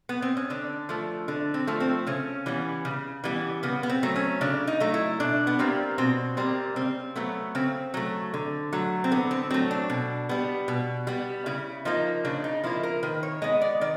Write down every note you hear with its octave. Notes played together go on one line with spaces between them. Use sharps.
B3
C4
C#4
D3 D4
F3 A3
D3 D4
C4
F3 A3
C4
C#3 C#4
E3 G3 B3
C#3
E3 G3 B3
C#3 B3
B3
C4
F#3 A3
C#4
C#3 D4
D#4
F#3 A3
E4
B2 D4
B3
G3 A#3 C4
B2 C4
G3 A#3 C4
C#3 C4
F#3 A3 B3
C#3 C4
F#3 A3
D3
F#3 A3
C4
D3 B3
C4
F#3 A3 C4
D4
B2
G3 B3
B2
G3 B3
C#3 E4
F3 A#3 D#4
C#3 D4
D#4
F3 A#3 E4
A#4
D#3 B4
C#5
G#3 B3 D#5
D5
D#3 D5